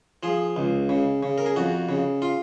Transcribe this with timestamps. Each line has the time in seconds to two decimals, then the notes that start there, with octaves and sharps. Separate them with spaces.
0.23 F3 G#4
0.56 C#2
0.89 C#3
1.23 C#3
1.38 A#4
1.46 G#4
1.56 F2 F#4
1.89 C#3
2.22 F4